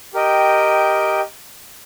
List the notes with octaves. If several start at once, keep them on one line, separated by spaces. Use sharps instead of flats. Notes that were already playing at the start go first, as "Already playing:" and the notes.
G4 A#4 D#5 G5